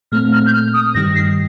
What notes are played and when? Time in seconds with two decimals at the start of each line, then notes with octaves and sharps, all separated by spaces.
0.12 A#2 A3 C4 F6
0.33 F6
0.46 G6
0.53 F6
0.74 D#6
0.95 G2 D#3 G3 A#6
1.16 C7